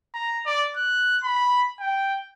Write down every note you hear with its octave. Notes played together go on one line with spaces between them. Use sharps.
A#5
D5
F#6
B5
G5